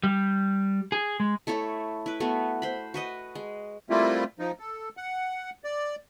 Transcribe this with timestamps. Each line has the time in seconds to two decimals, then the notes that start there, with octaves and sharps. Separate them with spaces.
0.03 G3
0.92 G#4
1.20 G#3
1.47 A3 E4 A4 C#5
2.06 E4 B4
2.20 A3 B3 F#4
2.62 C5 B5
2.94 F#4 B4 D#5
3.35 G#3
3.90 G3 A3 A#3 C4 E4 F4
4.39 F3 D#4
4.59 A4
4.97 F#5
5.64 D5